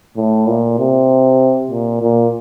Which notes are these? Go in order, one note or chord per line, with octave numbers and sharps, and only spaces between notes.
A2
A#2
C3
A#2
A#2